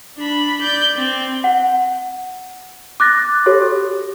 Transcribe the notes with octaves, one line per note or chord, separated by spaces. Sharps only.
D4 B5
D5 G6
C4
F#5
D6 F#6 A6 A#6
F#4 G4 A4 C#5